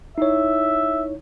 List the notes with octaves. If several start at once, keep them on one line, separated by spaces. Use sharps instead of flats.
D#4 E4 C#5 E5